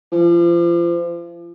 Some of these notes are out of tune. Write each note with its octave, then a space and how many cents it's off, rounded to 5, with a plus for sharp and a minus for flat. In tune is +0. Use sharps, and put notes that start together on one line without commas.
F3 -35